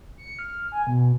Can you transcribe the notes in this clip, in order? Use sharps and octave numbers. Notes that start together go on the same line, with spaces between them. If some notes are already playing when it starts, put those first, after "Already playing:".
C#7
F6
G#5
B2